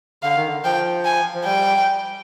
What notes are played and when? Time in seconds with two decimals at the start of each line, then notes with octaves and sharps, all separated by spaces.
0.23 D3 F5
0.36 D#3
0.47 D3
0.64 F3 G5
1.05 G#5
1.35 F3
1.45 G3 G5